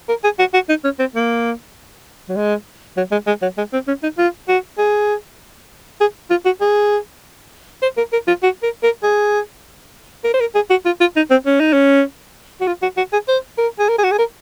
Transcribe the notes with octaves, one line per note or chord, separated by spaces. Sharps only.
A#4
G#4
F#4
F#4
D#4
C#4
C4
A#3
F#3
G#3
F#3
G#3
G#3
F#3
G#3
C4
C#4
D#4
F4
F#4
G#4
G#4
F4
F#4
G#4
C5
A#4
A#4
F4
F#4
A#4
A#4
G#4
A#4
C5
A#4
G#4
F#4
F4
F4
D#4
C4
C#4
D#4
C#4
F#4
F4
F#4
F#4
G#4
C5
A#4
G#4
A#4
G#4
F#4
G#4
A#4